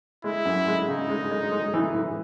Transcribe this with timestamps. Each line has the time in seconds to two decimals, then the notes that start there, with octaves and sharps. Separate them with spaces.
0.24 G#3 E4
0.45 F#2
0.67 G#3
0.88 C#3 D#4
1.10 G#3
1.31 G#3
1.52 G#3
1.74 E3
1.95 E3